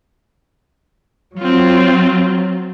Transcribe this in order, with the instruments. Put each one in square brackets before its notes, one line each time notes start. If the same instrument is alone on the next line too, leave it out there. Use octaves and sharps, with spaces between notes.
[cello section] F#3 [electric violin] C4 F4